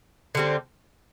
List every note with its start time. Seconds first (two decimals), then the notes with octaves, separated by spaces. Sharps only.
0.35 D3 G3 C4